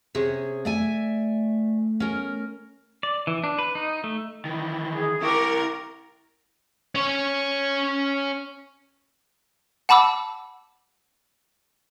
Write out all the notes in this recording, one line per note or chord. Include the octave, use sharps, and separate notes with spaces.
C3 C#4 G#4
A3 D5 E5 G#5
C#4 A#4
D5
E3
D4
B4
D#4
A3
D#3 E3
G#4
E4 G4 A#4 C#6 D6
C#4 C#5
F#5 A5 B5 D6 E6